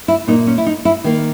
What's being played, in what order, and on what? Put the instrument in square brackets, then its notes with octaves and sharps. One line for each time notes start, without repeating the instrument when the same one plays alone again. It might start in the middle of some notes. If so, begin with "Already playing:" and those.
[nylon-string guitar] E4
A#2 A#3 D#4
C#4
E4
D#4
E4
D#3 A#3